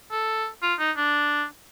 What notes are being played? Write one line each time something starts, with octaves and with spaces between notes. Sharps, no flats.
A4
F4
D#4
D4